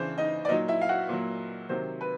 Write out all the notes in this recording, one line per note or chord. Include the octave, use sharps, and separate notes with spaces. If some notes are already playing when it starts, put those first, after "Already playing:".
Already playing: C#3 E3 D4 C5
D#4 D#5
D5
A#2 F#3 D#4 D#5
E4 E5
F5
F#4 F#5
A#2 F#3
C3 D#3 F#3 C5
B4